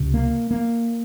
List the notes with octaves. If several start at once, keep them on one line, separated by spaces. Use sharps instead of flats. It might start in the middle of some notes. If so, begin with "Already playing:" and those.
Already playing: C#2 C3
A#3
A#3